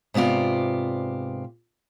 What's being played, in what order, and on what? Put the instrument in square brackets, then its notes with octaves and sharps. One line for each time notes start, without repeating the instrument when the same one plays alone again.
[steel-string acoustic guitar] G#2 C3 B3 F4 D5